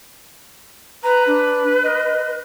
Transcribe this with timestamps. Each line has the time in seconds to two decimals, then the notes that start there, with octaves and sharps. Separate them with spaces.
1.03 B4 A#5
1.27 D4
1.84 D#5